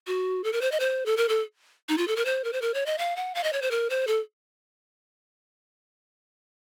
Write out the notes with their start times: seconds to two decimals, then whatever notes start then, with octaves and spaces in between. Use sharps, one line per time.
0.07 F#4
0.44 A4
0.53 A#4
0.61 C5
0.72 D#5
0.80 C5
1.06 A4
1.17 A#4
1.29 A4
1.89 D#4
1.98 F4
2.08 A4
2.16 A#4
2.25 C5
2.44 A#4
2.53 C5
2.62 A#4
2.74 C#5
2.86 D#5
2.98 F5
3.16 F#5
3.35 F5
3.44 D#5
3.53 C#5
3.62 C5
3.71 A#4
3.90 C5
4.07 A4